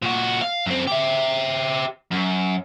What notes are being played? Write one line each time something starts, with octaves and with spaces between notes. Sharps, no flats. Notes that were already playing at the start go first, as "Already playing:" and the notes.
A#2 F#4
F5
F#2 C4
G4 E5
F#2